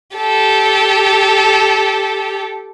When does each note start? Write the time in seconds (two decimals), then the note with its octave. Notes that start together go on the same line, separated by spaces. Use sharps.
0.17 G4 A4